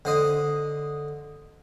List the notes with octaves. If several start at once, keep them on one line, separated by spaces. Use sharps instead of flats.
D3 C5 D#5